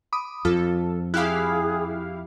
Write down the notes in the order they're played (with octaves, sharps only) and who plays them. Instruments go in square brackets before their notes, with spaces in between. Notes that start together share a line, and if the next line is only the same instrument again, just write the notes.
[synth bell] B5 D6 D#6
[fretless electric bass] F2 [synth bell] F4 [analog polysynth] A4
[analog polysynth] E4 G4 F5 [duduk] G#4 [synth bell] B5 F6 F#6